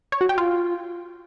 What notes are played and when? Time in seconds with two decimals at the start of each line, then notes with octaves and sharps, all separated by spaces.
0.12 C#5
0.21 F#4
0.29 G5
0.38 F4